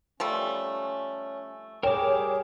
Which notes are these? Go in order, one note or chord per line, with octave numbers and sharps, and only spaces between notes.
F3 G3 A3 C#4
G3 G#4 A#4 C#5 G5 D6 E7